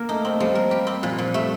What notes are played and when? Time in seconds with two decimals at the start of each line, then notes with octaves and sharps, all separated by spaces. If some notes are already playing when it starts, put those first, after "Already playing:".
Already playing: A#3 A#4
0.09 A3 D#4
0.24 A3 C4
0.40 F3 G3
0.55 A#4
0.71 G4
0.87 C4
1.03 A#2 F3
1.18 A#2
1.34 G3 A3